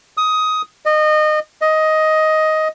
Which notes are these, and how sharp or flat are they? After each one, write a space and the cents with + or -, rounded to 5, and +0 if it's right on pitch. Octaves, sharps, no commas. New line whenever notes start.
D#6 +15
D#5 -25
D#5 +10